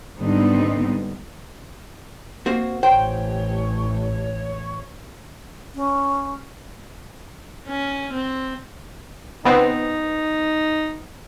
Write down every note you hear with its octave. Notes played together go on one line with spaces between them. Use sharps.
G#2 D3 G3 B3 C4 D#4
A#3 C4 F#4
A1 E3 C5 C#5 G5
C#4
C#4
C4
C#2 B3 C4 D#4